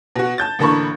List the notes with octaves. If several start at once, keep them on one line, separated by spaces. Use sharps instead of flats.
B2 F#4
A5 G6 A6
A1 D3 A#3 A5 B5 C#6